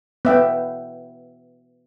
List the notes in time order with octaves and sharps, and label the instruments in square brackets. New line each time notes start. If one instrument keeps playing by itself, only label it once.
[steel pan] B3 E5 G5